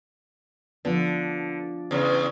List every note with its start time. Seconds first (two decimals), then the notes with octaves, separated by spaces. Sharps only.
0.85 D3 F3 B3
1.91 E2 C#3